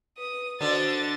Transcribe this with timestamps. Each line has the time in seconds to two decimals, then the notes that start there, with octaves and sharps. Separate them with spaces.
0.18 B4 D#6
0.61 D3 D4 F#4 C5 D#5 A6